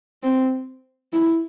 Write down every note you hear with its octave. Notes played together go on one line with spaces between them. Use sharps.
C4
E4